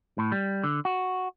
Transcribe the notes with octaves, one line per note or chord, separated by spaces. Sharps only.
A2
G3
D3
F#4